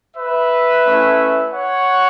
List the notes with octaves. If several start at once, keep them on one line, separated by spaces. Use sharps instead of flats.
B4 E5
A3 C#4 E4
C#5 F#5